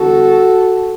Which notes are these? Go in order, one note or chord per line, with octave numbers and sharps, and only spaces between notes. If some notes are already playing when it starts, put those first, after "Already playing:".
Already playing: E2 D3 G3 B3 F#4 A4